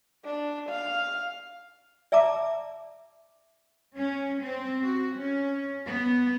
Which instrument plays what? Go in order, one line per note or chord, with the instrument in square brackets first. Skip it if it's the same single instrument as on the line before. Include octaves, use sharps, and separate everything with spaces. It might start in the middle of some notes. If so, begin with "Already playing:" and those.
[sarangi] D4
F5
[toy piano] D5 E5 A5 A#5 D6
[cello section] C#4
C4
F#4
C#4
B3